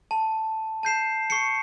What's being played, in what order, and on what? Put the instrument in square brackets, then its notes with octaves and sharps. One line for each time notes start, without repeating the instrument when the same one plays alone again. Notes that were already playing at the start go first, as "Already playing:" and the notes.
[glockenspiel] A5
A5 G6 C7 E7
C#6 C7 C#7